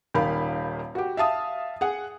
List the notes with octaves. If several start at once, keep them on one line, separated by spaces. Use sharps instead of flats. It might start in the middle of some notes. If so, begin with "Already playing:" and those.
D#1 D#3 F5 B5
F#4 G4
E5 F5 A5 D#6
G#4 F#5